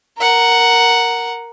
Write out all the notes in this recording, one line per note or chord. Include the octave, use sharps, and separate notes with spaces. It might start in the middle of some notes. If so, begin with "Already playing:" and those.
A#4 F#5